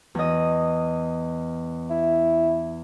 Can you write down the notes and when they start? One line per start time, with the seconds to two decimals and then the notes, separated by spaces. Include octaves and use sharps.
0.15 E2 D#5
1.90 E4